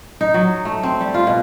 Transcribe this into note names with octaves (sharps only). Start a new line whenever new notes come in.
D#4
F#3
A3
C4
G3
F4
B2